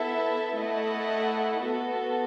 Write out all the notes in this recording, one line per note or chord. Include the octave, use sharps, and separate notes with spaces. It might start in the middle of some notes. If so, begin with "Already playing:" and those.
Already playing: B3 E4 A4 E5
A3 E4 A4 D#5 F#5
B3 F#4 A4